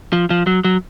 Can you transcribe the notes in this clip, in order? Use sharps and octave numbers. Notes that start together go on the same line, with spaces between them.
F3
F3
F#3
F#3